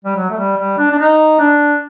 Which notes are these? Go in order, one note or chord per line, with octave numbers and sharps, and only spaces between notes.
G3
F#3
A3
G3
G3
D4
D4
D#4
D4